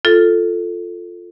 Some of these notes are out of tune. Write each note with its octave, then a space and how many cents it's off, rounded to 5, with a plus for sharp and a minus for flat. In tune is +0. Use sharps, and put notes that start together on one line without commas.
F4 +0 A4 +0